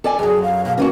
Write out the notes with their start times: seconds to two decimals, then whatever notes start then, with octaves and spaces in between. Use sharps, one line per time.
0.04 A4 D5 G#5
0.19 F#2 F#3 G#4
0.43 F5
0.65 B2 F5
0.78 E3 A#3 C#4 F#4